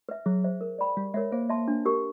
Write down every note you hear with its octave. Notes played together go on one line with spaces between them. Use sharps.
B4 E5
F#3 G#4
C5 E5
A#4
D5 G5 B5
G3 G4
G#3 A#4 C#5 E5
A#3 C5
E5 A5 C6
D4
G4 A#4